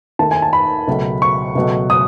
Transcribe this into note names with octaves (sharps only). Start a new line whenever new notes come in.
D#2 D#3 A3 A5
G#5
A5
B5
C#2 B2 F#3 A3
C#6
C#2 B2 F#3 A3
D#6